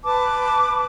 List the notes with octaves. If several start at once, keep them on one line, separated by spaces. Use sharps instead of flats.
B4 A5 D6